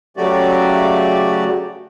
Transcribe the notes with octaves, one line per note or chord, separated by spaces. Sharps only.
C#3 F#3 A3 F#4 G4 D5